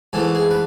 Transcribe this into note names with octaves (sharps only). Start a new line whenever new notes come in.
G#2 E3 A3 E4
G#4
B4